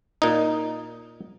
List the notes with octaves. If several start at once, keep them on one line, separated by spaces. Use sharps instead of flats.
A#2 D#4